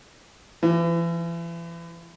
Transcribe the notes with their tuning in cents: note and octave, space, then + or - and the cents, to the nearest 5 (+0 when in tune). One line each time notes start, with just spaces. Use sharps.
E3 +40